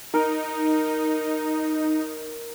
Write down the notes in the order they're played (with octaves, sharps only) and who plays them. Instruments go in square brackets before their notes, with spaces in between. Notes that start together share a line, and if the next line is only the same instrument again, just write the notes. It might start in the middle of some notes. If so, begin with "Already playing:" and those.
[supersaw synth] D#4 [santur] A#4